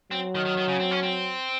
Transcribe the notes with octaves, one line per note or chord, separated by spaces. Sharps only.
F#3 C4
D#3
D#3
D#3
C#3
C4
C#4
C4